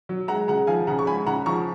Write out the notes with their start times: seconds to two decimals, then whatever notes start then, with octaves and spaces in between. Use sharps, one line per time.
0.09 F#3
0.28 G#3 F#5 A#5
0.48 C#3 F#5 A#5
0.67 F3 F5 G#5
0.87 C#3 F#5 A#5
0.99 C#6
1.07 G#3 G#5 B5
1.26 C#3 F#5 A#5
1.46 F3 A#5 C#6